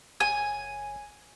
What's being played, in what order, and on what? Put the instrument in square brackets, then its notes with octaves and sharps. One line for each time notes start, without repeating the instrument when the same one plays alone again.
[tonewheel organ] F#1 [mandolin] G#5